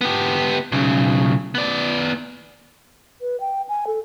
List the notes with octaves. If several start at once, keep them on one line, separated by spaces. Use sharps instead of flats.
B3 G4
B1 C#3
B3 D5
B4
G5
G#5
A4